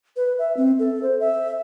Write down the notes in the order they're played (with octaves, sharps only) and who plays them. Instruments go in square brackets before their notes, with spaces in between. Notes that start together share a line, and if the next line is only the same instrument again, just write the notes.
[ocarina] B4
E5
C4
A4
C5
E5